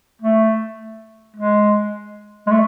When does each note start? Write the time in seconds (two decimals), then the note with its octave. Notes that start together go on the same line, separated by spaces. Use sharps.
0.21 A3
1.36 G#3
2.47 G#3
2.51 A3